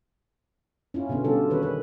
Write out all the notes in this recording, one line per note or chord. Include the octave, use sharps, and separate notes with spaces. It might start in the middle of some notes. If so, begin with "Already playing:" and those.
C#4 E4 F4
B2 D3 B3 C#4
C#3 G3 F4 G4 A4
D#3 E3 C#4 B4 C#5
B4